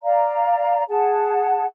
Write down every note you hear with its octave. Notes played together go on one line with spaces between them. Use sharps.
D5 F5 A#5
G#4 F#5 A5